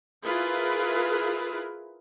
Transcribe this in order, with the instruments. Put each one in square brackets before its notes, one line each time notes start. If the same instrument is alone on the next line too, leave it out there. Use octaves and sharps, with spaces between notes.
[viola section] E4 F4 G#4 A#4 B4